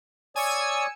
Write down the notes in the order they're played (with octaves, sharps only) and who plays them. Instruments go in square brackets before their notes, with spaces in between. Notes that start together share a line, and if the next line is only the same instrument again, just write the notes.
[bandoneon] C#5 D5 D#6 [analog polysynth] G#5 E6 C#7